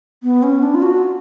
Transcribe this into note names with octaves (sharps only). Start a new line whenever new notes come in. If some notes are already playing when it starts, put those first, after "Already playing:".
B3
C#4
D4
F4
F#4